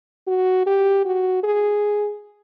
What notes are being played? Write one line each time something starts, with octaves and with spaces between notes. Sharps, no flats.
F#4
G4
F#4
G#4